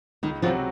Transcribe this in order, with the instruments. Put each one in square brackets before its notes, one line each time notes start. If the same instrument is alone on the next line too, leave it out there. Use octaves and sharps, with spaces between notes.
[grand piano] C#2 [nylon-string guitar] D#3 D#4
[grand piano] C3 F#3 C4 F#4 [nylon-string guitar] F3 F4